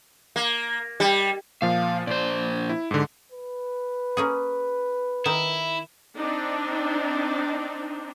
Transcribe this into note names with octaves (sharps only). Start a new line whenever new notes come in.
A#3
G3
A#2 F3 F5
A#2 F3 C5 D5
E4
G#2 D3
B4
A#3 C#4 G#4
D#3 E4
C4 D4 D#4